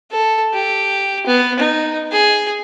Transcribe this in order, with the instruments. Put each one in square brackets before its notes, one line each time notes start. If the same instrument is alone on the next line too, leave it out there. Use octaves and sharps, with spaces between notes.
[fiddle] A4
G4
B3
D#4
G#4